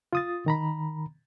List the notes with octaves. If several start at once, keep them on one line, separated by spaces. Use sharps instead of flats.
F4 D#6 A6
D#3 A#5 B5